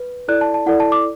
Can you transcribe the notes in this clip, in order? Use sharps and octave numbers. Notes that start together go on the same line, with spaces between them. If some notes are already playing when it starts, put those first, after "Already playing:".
Already playing: B4
E4 A4 D5 F#6
A5
A5
E4 A4 D5 F#5
A5
D6